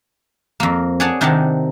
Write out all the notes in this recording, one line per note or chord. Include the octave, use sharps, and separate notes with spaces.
F2 A#3
G#4 C#5 D5 F#5 G#5 A5
C3 D#3 D4 D#4 F#5 A5